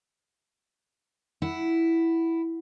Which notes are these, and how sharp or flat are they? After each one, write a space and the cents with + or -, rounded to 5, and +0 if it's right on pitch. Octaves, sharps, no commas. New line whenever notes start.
E4 +0 F#5 +5